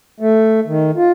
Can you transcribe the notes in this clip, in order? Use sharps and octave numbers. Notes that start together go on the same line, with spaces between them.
A3
D#3
F4